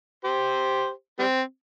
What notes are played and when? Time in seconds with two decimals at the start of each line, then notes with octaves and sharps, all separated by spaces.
0.24 G4 C5
1.19 G3 C4